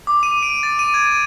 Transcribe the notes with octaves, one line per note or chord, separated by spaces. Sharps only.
D6
D#7
D7
A6
D#7
G#6
D#7